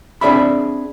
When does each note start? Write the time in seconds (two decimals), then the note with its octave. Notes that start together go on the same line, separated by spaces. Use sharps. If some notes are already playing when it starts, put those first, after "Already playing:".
0.21 C4 D4 G#4 D5 E5 B5